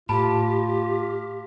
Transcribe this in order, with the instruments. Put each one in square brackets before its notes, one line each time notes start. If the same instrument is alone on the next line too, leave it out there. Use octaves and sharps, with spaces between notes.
[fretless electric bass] A2 [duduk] F4 [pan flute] G4 [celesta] A5 B5